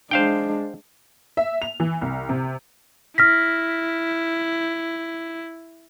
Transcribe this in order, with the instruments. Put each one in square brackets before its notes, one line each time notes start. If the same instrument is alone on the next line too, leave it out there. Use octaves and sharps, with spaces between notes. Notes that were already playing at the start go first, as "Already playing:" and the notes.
[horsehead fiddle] G#3 D4 [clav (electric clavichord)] C5 F5 G5
[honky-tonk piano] E5
F7
E3
C2
C3
[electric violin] E4 [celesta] F6 A#6 B6